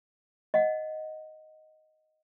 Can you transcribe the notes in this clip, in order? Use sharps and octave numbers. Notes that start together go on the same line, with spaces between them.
D#5 F#5